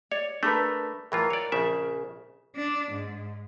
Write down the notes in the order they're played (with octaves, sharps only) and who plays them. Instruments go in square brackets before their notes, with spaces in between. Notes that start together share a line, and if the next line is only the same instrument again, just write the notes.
[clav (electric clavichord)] C#5 [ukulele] D5
[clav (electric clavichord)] A3 [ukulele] D4 A#4 B4
[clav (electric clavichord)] A2 E3 F4 [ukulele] A#4
[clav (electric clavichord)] C#5 D5
A#1 C#3 E5
[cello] D4
G#2